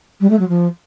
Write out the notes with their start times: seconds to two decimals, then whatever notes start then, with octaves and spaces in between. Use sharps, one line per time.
0.20 G3
0.30 A3
0.39 F#3
0.48 F3